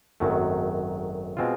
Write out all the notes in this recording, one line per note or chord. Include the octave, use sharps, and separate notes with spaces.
G#1 F#2 D#3 F#3 A3
B2 G#3 C4 F4